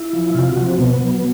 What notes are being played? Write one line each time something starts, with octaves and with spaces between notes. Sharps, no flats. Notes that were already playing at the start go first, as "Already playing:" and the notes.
Already playing: E4
F3
C3 F4
F#4
F3
C4
B2 B3
F#3